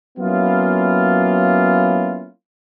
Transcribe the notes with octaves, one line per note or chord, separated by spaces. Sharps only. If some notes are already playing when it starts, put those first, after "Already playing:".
F#3 A#3 B3 C#4 E4 F4